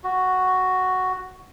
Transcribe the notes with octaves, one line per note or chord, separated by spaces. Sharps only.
F#4